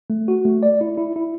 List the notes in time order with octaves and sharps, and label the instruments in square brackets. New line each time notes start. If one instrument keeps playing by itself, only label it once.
[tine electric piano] A3
F#4
A3
D5
E4
E4
E4